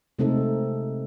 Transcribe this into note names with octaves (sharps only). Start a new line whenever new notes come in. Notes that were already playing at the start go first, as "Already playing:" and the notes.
C3 G#3 A3 C4 D#4 A4